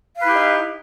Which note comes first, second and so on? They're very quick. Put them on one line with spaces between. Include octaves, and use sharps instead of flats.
F5 B4 E4 G4 D#4